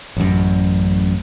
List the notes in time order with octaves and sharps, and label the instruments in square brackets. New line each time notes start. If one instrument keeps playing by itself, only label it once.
[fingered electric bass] A1 F#2